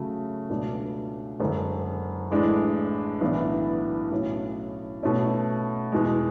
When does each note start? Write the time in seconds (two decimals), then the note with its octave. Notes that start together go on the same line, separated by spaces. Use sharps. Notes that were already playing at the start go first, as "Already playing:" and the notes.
Already playing: C#3 F#3 A3
0.50 C#2 B2 F#3 A3 D4
1.40 F#1 F#2 D3 G#3
2.31 A1 A2 G#3 D4
3.21 B1 A2 E3 B3 D4
4.12 B1 A2 F#3 C#4
5.03 B2 A3 C#4
5.92 E2 B2 G#3